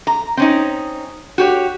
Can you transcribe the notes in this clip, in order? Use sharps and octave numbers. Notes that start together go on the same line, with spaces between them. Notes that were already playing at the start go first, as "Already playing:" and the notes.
A#5
C4 C#4 D#4
F#4 G4 C#5